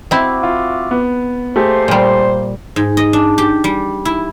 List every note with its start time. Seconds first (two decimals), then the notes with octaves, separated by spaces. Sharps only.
0.11 C4 E4 F#4 E5 D6
0.43 F4
0.91 B3
1.56 A3 A#3 G4 G#4 C5
1.88 A#2 G3
2.76 G#2
2.97 D#5
3.13 D4
3.38 G4
3.64 G3
4.05 E4